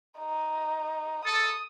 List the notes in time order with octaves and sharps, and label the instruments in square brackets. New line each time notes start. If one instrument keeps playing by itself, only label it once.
[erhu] D#4
[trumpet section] A4 [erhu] D#6